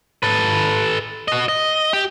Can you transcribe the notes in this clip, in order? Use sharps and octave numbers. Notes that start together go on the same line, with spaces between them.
A4 B4
F#4 D#5
D#5
G4